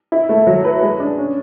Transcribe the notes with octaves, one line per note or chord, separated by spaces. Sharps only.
E4
A3
F#3
B4
G#3
D4
C#4